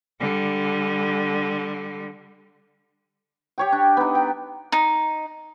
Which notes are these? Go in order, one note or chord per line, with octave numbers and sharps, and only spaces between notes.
D3 G3
G4 C#5 G5
D4
B3 D#4
G5
D#4